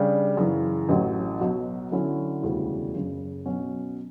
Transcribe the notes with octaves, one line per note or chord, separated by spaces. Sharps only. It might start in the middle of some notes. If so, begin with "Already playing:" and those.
Already playing: C#3 G3 D4 G4
F#2 C#3 E3
A1 A2 F#3
B1 B2 F#3
D3 F#3 C#4 E4
E1 D2 C#3 E3 G3
F#1 F#2 C#3
B2 F#3 C#4